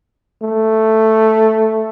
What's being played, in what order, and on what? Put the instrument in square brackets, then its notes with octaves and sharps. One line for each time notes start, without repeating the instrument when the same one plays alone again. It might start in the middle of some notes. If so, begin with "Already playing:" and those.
[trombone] A3